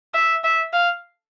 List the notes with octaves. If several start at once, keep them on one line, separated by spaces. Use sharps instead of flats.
E5
E5
F5